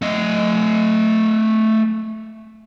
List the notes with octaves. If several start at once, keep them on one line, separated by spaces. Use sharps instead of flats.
A3 D#5